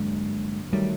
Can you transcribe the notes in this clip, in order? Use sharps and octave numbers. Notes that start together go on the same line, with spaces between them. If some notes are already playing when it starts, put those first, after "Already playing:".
Already playing: G2 D3 F#3 G#3 A#3 D4
D#3 F#3 G3 A3